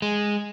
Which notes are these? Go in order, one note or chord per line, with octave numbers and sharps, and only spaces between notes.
G#3